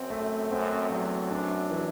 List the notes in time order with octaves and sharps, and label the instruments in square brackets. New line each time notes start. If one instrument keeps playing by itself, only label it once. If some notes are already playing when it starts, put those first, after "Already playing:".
Already playing: [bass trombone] F#2 [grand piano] C4
[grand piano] A3
[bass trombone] F#2 [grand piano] C4
[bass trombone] E2 [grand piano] F#3
[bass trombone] F#2 [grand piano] D4
[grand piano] E3